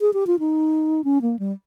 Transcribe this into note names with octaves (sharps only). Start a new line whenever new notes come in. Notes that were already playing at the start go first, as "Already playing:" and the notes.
G#4
G4
F4
D#4
C#4
A#3
G3